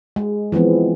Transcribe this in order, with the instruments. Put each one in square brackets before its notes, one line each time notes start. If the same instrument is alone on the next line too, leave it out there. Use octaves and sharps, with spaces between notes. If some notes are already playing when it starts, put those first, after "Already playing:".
[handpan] G#3
E3 F3 G#3 B3 C4